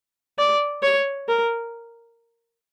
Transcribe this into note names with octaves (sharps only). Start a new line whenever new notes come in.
D5
C#5
A#4